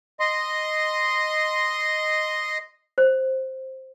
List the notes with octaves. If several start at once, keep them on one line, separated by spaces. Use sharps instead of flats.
D#5 C6
C5